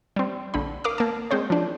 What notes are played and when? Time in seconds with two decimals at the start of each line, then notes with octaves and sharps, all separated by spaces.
0.16 G3 C4
0.54 A#1 D3 B5
0.84 A#4 F5 D6 D#6 F6
0.98 A#3 A5
1.31 G#3 C4 C5 C#5
1.50 F3 D4